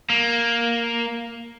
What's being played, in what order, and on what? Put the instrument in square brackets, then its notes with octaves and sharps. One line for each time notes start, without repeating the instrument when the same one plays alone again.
[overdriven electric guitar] A#3